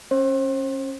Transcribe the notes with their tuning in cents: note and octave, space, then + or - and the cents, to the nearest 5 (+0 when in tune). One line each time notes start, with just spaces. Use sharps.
C#4 -25 C5 +35